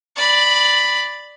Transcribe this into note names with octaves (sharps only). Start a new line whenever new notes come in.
D5 B5